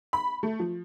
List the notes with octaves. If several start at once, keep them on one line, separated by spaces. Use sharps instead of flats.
B5
A3
F3